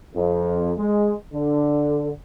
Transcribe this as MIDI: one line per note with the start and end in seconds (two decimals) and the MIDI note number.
0.15 0.72 41
0.77 1.14 56
1.33 2.11 50